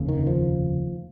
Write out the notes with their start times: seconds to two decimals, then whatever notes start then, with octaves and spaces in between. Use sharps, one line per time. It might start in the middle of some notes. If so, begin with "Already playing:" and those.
Already playing: F1 D#2 C#3
0.09 D#3
0.27 F3